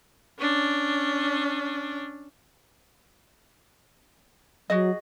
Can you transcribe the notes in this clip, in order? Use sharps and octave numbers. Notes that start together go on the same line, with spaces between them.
C#4 D4
F#3 F#4 G#4 D#5